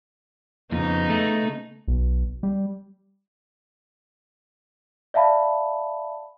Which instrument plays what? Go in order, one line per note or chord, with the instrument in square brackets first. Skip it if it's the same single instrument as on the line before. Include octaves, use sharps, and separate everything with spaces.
[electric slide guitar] F2 [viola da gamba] C#3 B3 D#4
[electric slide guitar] A3
[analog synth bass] B1
G3
[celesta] D5 E5 F5 A5 B5